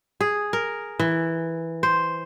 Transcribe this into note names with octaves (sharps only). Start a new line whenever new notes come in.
G#4
A#4
E3
C5